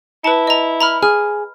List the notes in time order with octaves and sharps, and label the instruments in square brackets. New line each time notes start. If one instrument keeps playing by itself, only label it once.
[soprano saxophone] E4 [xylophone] B4 A5
[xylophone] D#5 A#5
A#5 B5 F6
[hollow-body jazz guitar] G#4 [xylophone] F6